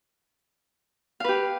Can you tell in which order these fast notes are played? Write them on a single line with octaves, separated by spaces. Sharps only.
F5 B4 G4